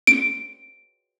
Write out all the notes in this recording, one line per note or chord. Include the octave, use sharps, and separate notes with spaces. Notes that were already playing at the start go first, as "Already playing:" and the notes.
D7